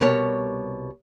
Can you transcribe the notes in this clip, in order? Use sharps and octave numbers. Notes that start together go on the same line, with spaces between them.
C2 B2 G3 A#4 C#5